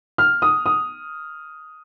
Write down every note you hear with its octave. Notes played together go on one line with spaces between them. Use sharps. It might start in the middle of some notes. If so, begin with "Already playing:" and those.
F6
D#6
D#6